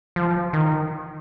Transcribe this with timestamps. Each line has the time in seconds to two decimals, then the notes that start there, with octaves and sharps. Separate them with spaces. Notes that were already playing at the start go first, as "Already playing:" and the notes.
0.16 F3
0.53 D#3